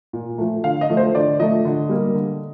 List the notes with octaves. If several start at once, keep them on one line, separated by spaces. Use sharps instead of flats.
A#2
F3 A3
D3 F5
D#5
F3 A3
C5
D3 D5
F3 A3 D#5
D3
G3 A#3
D3